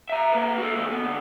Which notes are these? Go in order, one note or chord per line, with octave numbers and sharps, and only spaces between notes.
E5 A#5
A#3 B4
F#4 A4
D#3 G#3
B3
D3